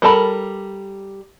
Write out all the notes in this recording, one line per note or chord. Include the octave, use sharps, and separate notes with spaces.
G3 A4 A#4 A5 B5